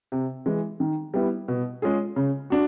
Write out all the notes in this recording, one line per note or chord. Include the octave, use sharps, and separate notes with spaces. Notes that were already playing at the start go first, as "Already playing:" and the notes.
C3
E3 G#3
D#3
G3 B3 E4
B2
G#3 C#4 F4 G#4
C#3
D4 F#4